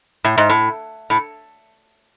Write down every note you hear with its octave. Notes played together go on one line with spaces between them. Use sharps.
A2
G#2
A2
A2